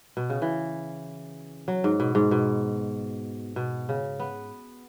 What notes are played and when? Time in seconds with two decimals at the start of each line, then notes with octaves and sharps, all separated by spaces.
0.17 B2
0.30 C#3
0.42 E3
1.68 F#3
1.84 G#2
2.00 B2
2.15 G#2
2.31 B2
3.56 B2
3.89 C#3
4.20 B3